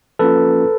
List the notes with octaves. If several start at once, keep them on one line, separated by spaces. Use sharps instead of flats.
F3 A#3 C#4 F4 A4 B4